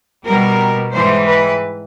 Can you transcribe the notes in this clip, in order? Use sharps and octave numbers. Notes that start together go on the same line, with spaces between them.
B2 G3 A#4
G#2 E3 G3 C5
B4